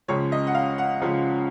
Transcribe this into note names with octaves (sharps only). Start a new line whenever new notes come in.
C#2 C#3 F3 G#3 C#5
D#5
F#5
F5
F#5
C#2 C#3 F3 G#3